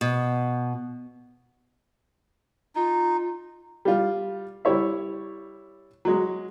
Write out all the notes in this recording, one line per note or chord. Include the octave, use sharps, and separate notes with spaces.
B2
D#4 F4
G3 F4
G3 E4 C#5 E5
F#3 G#3